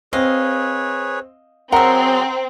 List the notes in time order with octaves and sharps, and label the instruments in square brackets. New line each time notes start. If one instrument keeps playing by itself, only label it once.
[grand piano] C4 [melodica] G#4 B4 C#5 [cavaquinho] D#5 F5
[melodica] F#3 G#4 C6 [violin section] C4 [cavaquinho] A#4 E5 [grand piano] F#5